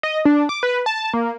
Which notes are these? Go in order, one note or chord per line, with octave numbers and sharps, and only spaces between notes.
D#5
D4
D6
B4
A5
A#3